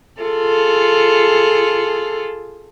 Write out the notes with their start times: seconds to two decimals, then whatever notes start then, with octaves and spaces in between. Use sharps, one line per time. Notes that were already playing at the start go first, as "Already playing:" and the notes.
0.21 F4 G#4 A4